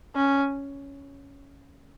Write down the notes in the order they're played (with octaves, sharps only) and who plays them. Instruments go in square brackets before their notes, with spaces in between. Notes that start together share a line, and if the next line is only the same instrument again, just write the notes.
[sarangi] C#4